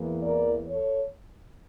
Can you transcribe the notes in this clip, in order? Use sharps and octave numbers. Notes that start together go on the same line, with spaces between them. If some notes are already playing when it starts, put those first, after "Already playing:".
Already playing: E2 E3 A#3
A#4 D5
A4 C#5